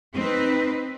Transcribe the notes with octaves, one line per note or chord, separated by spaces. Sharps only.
C4 D#4 B4